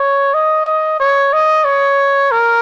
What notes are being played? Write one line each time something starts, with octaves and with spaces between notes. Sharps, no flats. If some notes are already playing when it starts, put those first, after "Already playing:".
Already playing: C#5
D#5
D#5
C#5
D#5
C#5
A#4